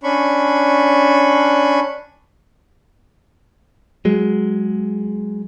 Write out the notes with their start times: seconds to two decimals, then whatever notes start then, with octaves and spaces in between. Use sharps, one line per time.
0.03 C#4 D4 B5 C#6
4.05 F#3 G#3